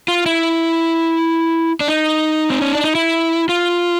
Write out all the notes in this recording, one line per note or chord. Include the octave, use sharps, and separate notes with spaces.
F4
E4
D4
D#4
C4
C#4
D4
D#4
E4
F4